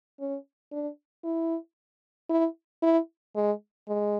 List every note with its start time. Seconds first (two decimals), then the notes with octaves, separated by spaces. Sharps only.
0.20 C#4
0.72 D4
1.24 E4
2.29 E4
2.83 E4
3.36 G#3
3.88 G#3